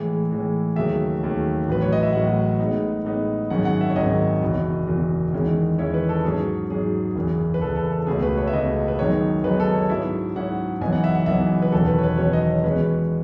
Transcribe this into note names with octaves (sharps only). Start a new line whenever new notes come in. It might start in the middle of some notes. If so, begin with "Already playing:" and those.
Already playing: A2 E3 G#3
A2 E3 G#3
D#2 C#3 F#3 A3 E5
D#2 C#3 F#3 A3
A1 A2 F#3 B4
C#5
D#5
E5
A1 A2 F#3 F#5
A2 G#3 B3 D#4
A2 G#3 B3 D#4
G#1 F#2 D#3 G#3 C#4 F#5
F#5
E5
C#5
G#1 F#2 D#3 G#3 C#4 D#5
F#1 E2 B2
F#1 E2 B2
E2 D#3 G#3 C#4 E4
E2 D#3 G#3 C#4 E4 C#5
B4
A4
G#2 F#3 C#4 G#4
G#2 F#3 C#4 G#4
F#1 E2 C#3
B4
F#1 E2 C#3 A4
A4
A4
C#2 B2 A3 C#4 G#4
B4
C#5
E5
C#2 B2 A3 C#4 D#5
B4
F#2 D#3 G#3 B3 D#4 C#5
F#2 D#3 G#3 B3 D#4 B4
A4
C#5
G#2 F#3 C#4 E4 E5
G#2 F#3 C#4 E4 F#5
F#1 F#2 E3 B3 D#4 G#5
F#5
E5
F#5
F#1 F#2 E3 B3 D#4 E5
B4
E1 E2 D#3 F#3 C#4 A4
B4
C#5
B4
E1 E2 D#3 F#3 C#4 C#5
D#5
C#5
E2 B2 G#3 C#4 B4